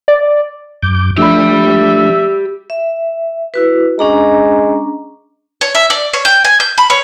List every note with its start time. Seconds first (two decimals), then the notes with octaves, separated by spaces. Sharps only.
0.08 D5
0.82 F#2 D6 G6
1.18 F3 A3 D4 G4 E5 B5
2.70 E5
3.54 E4 F#4 B4
3.99 G#3 C#4 D4 A#5
5.61 C#5
5.75 E5
5.90 D5
6.13 C#5
6.25 G5
6.44 G#5
6.60 G6
6.78 B5
6.90 C#5